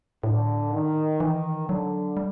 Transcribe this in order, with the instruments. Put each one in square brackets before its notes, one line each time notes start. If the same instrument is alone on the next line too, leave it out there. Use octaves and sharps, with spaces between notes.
[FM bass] A2 [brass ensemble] D3
[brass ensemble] D#3
[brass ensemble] D#3 [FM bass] E3
[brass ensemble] D3 [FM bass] F#3
[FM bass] G3